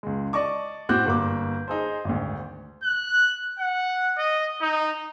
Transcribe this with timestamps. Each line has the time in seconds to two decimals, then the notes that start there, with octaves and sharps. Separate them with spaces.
0.03 C#2 G#3
0.33 D5 D#5 A5 C#6 D6
0.89 A2 C4 F#4 D6 F#6 G6
1.06 G1 A#3 D6
1.68 D#4 G#4 C5
2.05 G#1 D2
2.83 F#6
3.59 F#5
4.18 D#5
4.62 D#4